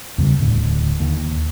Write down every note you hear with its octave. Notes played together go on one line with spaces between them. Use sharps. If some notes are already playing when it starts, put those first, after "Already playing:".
E2 C#3 G3
D1 A2 D3
D#2